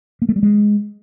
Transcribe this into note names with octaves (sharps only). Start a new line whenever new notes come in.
A#3
A3
G3
G#3